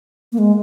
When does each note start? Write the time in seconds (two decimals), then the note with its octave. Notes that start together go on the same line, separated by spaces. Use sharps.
0.32 A#3
0.38 G#3